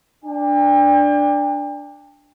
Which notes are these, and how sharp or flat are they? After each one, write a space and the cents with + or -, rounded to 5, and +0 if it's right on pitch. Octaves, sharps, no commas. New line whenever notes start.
D4 +0 G5 +40